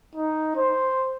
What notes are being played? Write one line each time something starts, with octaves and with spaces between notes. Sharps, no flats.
D#4
C5